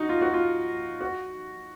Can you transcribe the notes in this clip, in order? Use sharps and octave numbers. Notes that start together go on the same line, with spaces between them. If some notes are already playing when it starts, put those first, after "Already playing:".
Already playing: D#4 F#4
F4
F#4
F4
F#4